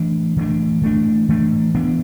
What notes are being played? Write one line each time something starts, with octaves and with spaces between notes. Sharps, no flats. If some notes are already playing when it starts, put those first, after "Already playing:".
Already playing: E3 A3 D4
E3 A3 D4
E3 A3 D4
E3 A3 D4
E3 B3 D4